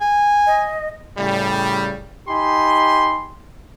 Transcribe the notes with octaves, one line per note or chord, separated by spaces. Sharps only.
G#5
D#5
A2 C#3 G3
D#4 G4 G#5 B5 C6